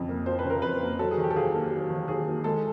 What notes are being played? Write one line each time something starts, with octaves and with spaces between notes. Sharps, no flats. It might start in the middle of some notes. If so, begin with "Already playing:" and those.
Already playing: F2 C#3 F3
A#3
F3 C5
B4
C#3
A#4
F2 B4
A#3
F#3 A4
G#4
D#3
G4
A4
D#2 G#4
A#3
F#3
D#3
D#2 G#4
A#3
G#3 A4